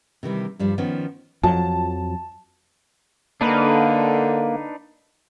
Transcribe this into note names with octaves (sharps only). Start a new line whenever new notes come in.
C3 D#3 E3 G3
G2 F3 G3 D4
D#3 F3 B3 C#4
F2 F3 F#3 A5
D3 A#3 D4 D#4 B4